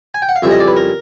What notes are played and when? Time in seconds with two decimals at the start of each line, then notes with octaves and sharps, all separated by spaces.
0.14 G#5
0.22 G5
0.29 F#5
0.36 F5
0.42 F2 C#3 E3 G3 E5
0.51 D#5
0.60 D5
0.67 B4
0.76 A#4